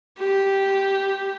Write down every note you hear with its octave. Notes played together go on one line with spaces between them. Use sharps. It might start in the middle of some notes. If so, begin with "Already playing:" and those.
G4